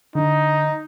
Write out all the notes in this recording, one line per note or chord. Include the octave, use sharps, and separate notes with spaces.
D3 D#4